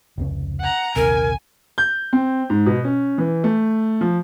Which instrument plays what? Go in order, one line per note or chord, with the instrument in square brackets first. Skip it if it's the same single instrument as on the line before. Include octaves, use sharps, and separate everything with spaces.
[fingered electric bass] F1 C#2 C#4
[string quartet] F#5 A#5
[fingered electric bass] A#1 D#2 C3 [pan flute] A#4 [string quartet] G#5
[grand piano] G6
C4
G#2
B2
C#4
E3
A3
F3